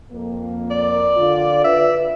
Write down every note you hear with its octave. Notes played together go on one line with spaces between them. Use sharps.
F2 A#3
D5
D3 F4
B4 E5